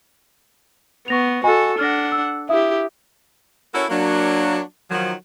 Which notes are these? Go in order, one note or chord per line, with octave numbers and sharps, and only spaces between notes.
B3 C#6 A#6 F7
F#4 A4 D#5 G#5 B5
D4 F#5 F6 A#6
E6
E4 G4 E5 F5 D#6
C#4 E4 F#4 A4 A#4 C#5
F#3 A#3 D4
D#3 F3 F#3